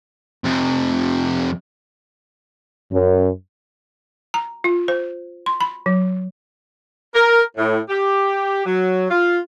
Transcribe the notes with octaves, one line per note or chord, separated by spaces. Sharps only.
F2 C3
F#2
A#5
F4
C5
C6
B5
F#3
A#4
A2
G4
F#3
F4